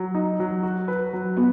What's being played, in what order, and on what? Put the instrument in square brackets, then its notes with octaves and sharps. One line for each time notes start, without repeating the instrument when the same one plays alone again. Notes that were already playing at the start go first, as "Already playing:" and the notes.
Already playing: [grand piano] F#3
D#4
F#3
F#4
B4
F#3
[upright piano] B3 [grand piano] F#4